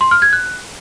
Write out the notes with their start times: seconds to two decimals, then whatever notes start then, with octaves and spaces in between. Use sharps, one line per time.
0.01 C6
0.11 F6
0.22 G#6
0.33 F#6